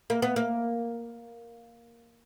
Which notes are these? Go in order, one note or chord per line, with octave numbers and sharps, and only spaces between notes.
A#3
B3
A#3